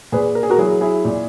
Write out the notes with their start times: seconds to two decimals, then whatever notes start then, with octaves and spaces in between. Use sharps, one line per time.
0.12 A#2 G#4 B4
0.35 A#4
0.43 G#4
0.50 F#4 A#4
0.58 F#3 E4 G#4
0.81 E4 G#4
1.05 A#2